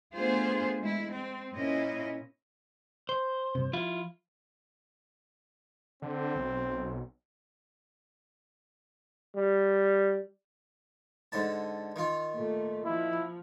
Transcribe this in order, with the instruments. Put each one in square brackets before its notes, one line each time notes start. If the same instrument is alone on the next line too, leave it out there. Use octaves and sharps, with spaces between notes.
[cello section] A3 B3 D4 F4 G#4 C5
G#3 E4
C4
A#2 C#4 E4 D#5
[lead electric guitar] C5
[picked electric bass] G2 C3
[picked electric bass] F3 [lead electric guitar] E4 F4
[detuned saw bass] D3 [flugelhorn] C4
[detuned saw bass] B1
[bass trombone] G3
[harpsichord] G#2 D3 A5
D#3 F4
[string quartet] A#2 A3
[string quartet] F3 [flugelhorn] E4